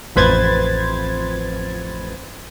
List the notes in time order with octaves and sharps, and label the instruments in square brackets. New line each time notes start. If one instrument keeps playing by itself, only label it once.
[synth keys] A1 F2 B4 C5 G#6 A6